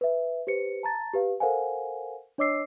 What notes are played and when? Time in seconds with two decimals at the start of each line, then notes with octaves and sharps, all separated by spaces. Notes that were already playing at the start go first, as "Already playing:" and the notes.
0.01 B4 E5
0.47 G4 B4 C5 C#7
0.83 A5 A#5 A6
1.13 G4 B4 F5
1.40 A4 A#4 C5 F5 F#5 G#5
2.38 D4 C#5 D#5 D6 E6 C7